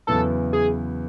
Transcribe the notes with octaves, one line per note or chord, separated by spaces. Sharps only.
E2 C#3 F#3 B3 E4 A4
G#4